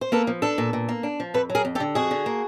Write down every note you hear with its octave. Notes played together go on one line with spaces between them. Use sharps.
C5
A#3 A4 B4
F3
D4 A4 B4
A#2
A#2
A#3
D4
F3
F2 A4 B4
F#3
G#4 A#4
F2
G4 A4
D3
F2 F#4 G#4
D3
A#3